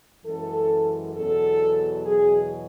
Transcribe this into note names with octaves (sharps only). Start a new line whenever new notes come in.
F#2 E3 G#3 A4
E2 B2 F#3 A4
E2 B2 F#3 G#4